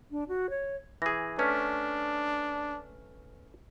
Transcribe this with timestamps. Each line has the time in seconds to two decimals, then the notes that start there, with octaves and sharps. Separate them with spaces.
0.11 D4
0.29 F#4
0.50 C#5
1.02 E3 G#4 A#6
1.39 A3 C#4 D4 B4 F6 B6